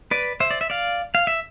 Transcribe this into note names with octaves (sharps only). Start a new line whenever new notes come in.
B4 D5
C5 E5
D5
E5
D5 F5
F5
E5